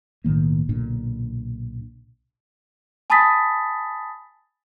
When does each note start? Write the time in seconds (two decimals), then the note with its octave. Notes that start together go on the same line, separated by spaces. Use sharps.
0.24 B1 A2 D#3 A#3
0.69 B1 A#2 D3
3.10 G#5 A5 B5 D#6 A6 B6